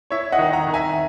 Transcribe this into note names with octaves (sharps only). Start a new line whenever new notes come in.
E4 C#5 E5
D#5 F#5
D#3
F#5 A#5
D#3
E5 G#5